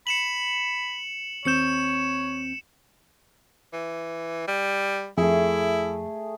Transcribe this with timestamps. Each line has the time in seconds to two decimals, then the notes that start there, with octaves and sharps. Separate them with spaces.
0.07 B5 C#7 E7 F#7
1.45 D#2 C4 C#5 G6 C#7 E7
3.73 E3
4.48 G3
5.17 F2 A3 E4 G#4